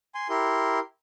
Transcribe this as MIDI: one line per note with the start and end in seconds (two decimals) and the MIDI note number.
0.15 0.28 80
0.15 0.28 84
0.29 0.79 64
0.29 0.79 67
0.29 0.79 70
0.29 0.79 84